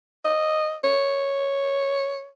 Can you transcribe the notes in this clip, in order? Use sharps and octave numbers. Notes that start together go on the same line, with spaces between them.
D#5
C#5